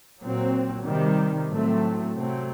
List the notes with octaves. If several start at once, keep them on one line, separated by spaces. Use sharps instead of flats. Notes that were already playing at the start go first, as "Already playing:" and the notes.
A#2 F#3 C4
C3 D#3 G3
A2 F#3 A3 C4
C3 F#3 A3 C4